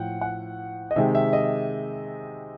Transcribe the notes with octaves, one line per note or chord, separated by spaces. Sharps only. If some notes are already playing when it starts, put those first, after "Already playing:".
Already playing: A2 F3 F#5 G5
F#5
D#5
C3 D#3 G#3 E5
E5
D#5